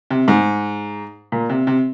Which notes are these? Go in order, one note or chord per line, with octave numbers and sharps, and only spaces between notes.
C3
G#2
A#2
C3
C3